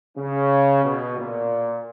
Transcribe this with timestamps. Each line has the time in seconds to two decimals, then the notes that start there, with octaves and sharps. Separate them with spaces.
0.17 C#3
0.84 B2
1.17 A#2